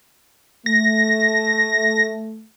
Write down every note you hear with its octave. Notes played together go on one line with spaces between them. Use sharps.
A3 A#6